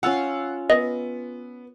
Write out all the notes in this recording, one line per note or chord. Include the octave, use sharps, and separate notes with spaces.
C#4 F4 F5 F#5 E6
B3 D#5